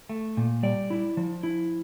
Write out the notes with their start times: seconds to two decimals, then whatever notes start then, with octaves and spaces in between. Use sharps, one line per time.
0.09 A3
0.37 A#2
0.63 G3 D5
0.90 E4
1.17 F3
1.43 E4